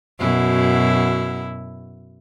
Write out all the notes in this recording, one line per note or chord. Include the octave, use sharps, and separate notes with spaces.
F#2 B2 E4